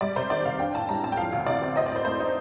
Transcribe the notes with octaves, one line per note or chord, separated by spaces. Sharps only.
G3 D5
C3 C5
D#3 D5
C3 F5
D4 G5
A2 A5
G3 A#5
A2 A5
G5
F3 F5
D2
C3 D5
C4
C4 D#5
D5
A2 C5
A3 C5
D#4